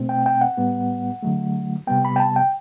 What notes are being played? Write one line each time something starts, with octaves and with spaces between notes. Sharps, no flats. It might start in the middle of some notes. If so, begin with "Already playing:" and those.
Already playing: B2 A3 C4
G5
G5
F#5
A2 G3 B3
D3 F#3 A3
C3 G3 B3 G5
B5
G5
A5
G5